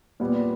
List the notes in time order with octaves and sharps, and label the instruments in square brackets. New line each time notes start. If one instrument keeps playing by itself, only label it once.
[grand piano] A#2 G3 B3